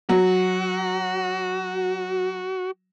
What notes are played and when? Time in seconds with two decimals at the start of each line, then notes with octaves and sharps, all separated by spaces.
0.09 F#3 F#4